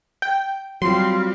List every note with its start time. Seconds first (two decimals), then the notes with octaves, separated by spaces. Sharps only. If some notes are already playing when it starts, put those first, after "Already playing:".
0.22 G5
0.82 F#3 G3 C4 F4 C6